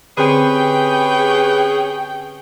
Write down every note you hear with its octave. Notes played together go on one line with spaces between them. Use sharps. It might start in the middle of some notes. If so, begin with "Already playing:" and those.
D3 C4 C#4 G4 G#4 B4 C5 G5